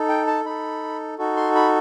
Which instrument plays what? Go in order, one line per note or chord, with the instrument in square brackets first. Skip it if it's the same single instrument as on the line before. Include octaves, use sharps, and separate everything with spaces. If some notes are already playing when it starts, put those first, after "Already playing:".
Already playing: [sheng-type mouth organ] D#4 A4
G5
A5
D#4 A4 B5
D#4 F#4 A4
C6
B5